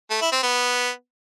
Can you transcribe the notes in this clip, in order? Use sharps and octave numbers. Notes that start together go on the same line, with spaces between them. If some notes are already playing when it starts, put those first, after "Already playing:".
A3
E4
C4
B3